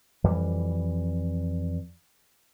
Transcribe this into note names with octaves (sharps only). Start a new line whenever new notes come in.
F2 E3 G3